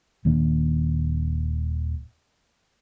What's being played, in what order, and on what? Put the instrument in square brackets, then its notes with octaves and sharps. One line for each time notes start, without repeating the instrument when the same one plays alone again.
[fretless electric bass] D#1 D#3 A#3 D4